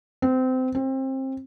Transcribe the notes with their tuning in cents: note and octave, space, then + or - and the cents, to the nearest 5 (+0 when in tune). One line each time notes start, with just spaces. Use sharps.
C4 -25
C4 +25